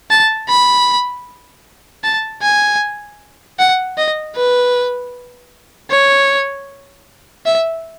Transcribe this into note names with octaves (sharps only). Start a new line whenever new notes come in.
A5
B5
A5
G#5
F#5
D#5
B4
C#5
E5